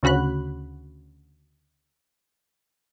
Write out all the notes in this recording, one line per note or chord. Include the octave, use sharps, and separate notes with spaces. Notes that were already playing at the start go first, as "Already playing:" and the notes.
D2 C#3 F#4 B5 F#6